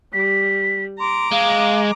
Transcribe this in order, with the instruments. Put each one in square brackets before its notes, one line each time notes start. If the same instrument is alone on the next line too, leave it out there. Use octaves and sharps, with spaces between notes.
[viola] G3 [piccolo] B6
[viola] A#5 D6 [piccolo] C6
[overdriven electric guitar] G#3 [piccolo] F5